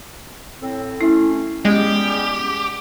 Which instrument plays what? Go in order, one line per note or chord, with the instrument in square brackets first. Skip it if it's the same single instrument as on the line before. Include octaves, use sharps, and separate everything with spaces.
[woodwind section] A2 C4
[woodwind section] A3 C#4 [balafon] E4
[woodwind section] G3 B3 C#4 [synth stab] G#3 [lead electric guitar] G4